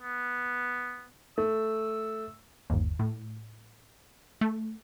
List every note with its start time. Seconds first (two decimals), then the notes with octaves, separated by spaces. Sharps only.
0.01 B3
1.38 A3 E6
2.70 G1 D#2
2.99 A2
4.41 A3